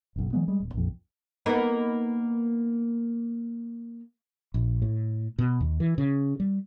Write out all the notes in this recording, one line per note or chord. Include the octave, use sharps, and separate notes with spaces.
F#1 B1
E3 F#3 G#3 B3
G3 G#3
D#1
A#1 F2
A#3 B3 D#4
A#1
A2
B2
D#2
E3
C#3
G3